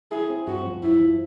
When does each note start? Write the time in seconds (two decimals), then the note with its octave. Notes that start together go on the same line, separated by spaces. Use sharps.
0.12 E4 G#4
0.30 C4
0.47 G2 F#4
0.65 F3
0.83 F#2 E4
1.01 F3